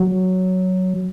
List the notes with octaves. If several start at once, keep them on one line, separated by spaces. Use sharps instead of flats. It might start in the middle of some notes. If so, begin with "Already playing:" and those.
Already playing: F#3